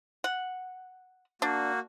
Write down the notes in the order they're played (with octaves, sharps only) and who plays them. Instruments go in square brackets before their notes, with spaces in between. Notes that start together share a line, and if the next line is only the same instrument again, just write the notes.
[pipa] F#5
[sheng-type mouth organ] A#3 F#4 [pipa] D4